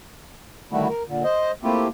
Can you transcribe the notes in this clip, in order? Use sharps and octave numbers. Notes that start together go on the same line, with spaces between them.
D3 D#3 G3 A3 E4 F#4
A#4
A#2 D3
C5 D#5
A3 A#3 C4 E4 F4 G4